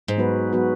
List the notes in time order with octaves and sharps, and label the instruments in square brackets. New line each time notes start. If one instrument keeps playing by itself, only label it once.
[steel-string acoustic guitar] G#2
[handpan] F#3 B3 F#4 B4
F#3 B3 F#4 B4